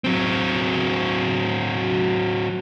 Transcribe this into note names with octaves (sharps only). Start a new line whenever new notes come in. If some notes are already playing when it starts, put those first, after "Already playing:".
F#3 C4